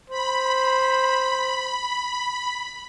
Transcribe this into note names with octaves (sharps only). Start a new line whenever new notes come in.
C5 B5